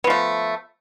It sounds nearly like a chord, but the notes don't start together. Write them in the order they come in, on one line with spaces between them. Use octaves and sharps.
B3 F3 A3